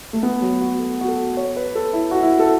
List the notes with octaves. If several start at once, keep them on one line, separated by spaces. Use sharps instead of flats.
A3
B3
F#3
F#4
A4
F#4
A4
C#5
B4
A4
E4
F#4
E4
A4